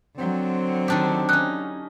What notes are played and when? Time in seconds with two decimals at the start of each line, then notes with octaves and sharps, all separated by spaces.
0.18 D3 F#3 C4
0.88 D#3 D4 G4
1.29 C#4 D#4 F#6